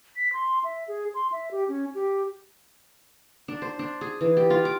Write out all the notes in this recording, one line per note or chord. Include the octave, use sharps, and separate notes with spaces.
B6
C6
E5
G#4
C6
E5
G4
C#4
G4
D4
C5
D4
G#4
E3
G4
F4
D6